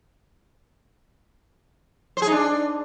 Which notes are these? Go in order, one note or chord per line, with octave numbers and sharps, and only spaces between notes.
C5
G#4
D#4
D4